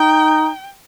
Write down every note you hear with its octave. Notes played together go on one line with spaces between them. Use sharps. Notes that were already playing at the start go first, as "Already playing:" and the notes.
Already playing: D#4 G5